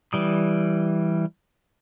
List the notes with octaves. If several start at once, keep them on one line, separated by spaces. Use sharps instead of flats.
E3 G3 D#6